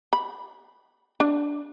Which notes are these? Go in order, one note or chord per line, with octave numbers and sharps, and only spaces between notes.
B5
D4